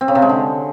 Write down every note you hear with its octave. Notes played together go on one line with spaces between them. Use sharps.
C4
C#3
C3
G#3
D3